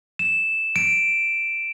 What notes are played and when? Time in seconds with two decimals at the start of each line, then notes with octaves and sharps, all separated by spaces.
0.19 E7
0.76 D7